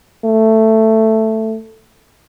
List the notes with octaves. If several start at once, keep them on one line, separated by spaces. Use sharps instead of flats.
A3